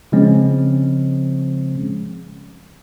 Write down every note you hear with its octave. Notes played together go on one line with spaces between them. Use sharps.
C#3 F3 G#3 C4 C#4